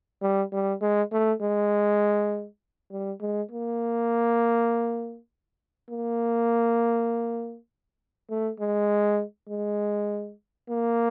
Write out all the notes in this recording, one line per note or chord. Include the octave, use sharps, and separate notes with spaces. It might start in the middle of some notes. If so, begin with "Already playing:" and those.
G3
G3
G#3
A3
G#3
G3
G#3
A#3
A#3
A3
G#3
G#3
A#3